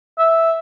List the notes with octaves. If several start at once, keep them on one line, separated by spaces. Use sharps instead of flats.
E5